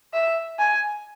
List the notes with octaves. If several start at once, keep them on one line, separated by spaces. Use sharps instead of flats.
E5
G#5